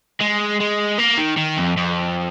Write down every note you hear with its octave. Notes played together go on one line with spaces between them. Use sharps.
G#3
G#3
A#3
D#3
D#3
F2
F2